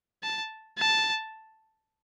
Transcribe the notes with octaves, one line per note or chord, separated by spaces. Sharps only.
A5
A5